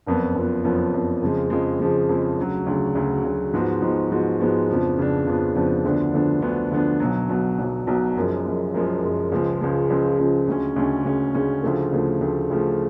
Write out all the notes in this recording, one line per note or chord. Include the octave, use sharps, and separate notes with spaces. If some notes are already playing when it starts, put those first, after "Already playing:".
F#1 F2 F3 B3
F#1 F2 F3 B3
F#1 F2 F3 B3
F#1 F2 F3 B3
F2 C#3 F3 G#3
F2 C#3 F3 G#3
F2 C#3 F3 G#3
F2 C#3 F3 G#3
D2 C#3 F#3
D2 C#3 F#3
D2 C#3 F#3
D2 C#3 F#3
G#2 F3 G#3 B3 F#4
G#2 F3 G#3 B3 F#4
G#2 F3 G#3 B3 F#4
G#2 F3 G#3 B3 F#4
F2 C#3 F3 B3 D4
F2 C#3 F3 B3 D4
F2 C#3 F3 B3 D4
F2 C#3 F3 B3 D4
D2 D3 F3 B3 D4
D2 D3 F3 B3 D4
D2 D3 F3 B3 D4
D2 D3 F3 B3 D4
B1 B2 F#3
B1 B2 F#3
B1 B2 F#3
B1 B2 F#3
F#1 F#2 F3 G#3
F#1 F#2 F3 G#3
F#1 F#2 F3 G#3
F#1 F#2 F3 G#3
C#2 C#3 F3 G#3
C#2 C#3 F3 G#3
C#2 C#3 F3 G#3
C#2 C#3 F3 G#3
D2 C#3 G#3 C#4
D2 C#3 G#3 C#4
D2 C#3 G#3 C#4
D2 C#3 G#3 C#4
D2 C#3 F3 A3
D2 C#3 F3 A3
D2 C#3 F3 A3
D2 C#3 F3 A3